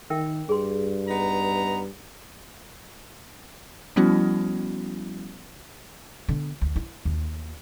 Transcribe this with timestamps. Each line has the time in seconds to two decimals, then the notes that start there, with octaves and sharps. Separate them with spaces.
0.10 D#3 A#4 E5 G5
0.49 G2 G#4 C6
1.08 B3 D#4 A#5
3.96 F3 G3 B3 C#4 E4 F#4
6.28 D3 B3
6.61 D2
6.76 E4
7.05 D#2